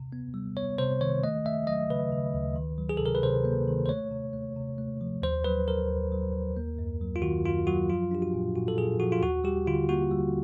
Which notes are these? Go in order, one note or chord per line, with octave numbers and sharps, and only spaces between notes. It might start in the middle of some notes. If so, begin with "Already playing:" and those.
Already playing: C3
B3
G3
B3 C#5
C3 C5
D#3 C#5
A3 D#5
A3 E5
F#3 D#5
C#3 B4
C#3
D2
D#3
F#3
G#4
C3 A4
A#4
B4
C3 C5
A#3
D#3
C5
A3 C#5
C3
A3
C3
A3
F3
D#2 C5
F#3 B4
F#3 A#4
D#2
F#3
D#2
A#3
F#2
F#3
F4
D#3 F#4
F#2 F4
F#3 F#4
F3 F4
D4 G4
F#4
A#2
A#2 F#4
A4
A#2 G#4
F3 F#4
F4
D#2 F#4
G3 G4
D3 F4
A#3 F#4
G3